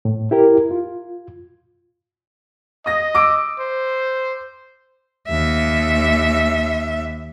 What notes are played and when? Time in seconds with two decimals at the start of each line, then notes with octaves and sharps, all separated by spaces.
0.05 A2
0.31 E4 G4 A#4
0.71 F4
2.86 D#5 D#6 A#6
3.15 D6 E6 D7
3.59 C5
5.28 D#2 E5